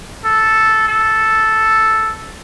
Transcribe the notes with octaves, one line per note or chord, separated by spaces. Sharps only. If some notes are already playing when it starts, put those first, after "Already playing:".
A4
A4